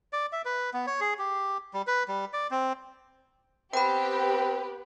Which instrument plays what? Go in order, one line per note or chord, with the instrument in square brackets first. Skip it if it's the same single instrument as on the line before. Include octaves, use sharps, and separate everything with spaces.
[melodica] D5
E5
B4
B3
C#5
G#4
G4
G3
B4
G3
D5
C4
[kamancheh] B3 B4 [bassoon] C4 [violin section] G4 [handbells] G5 B5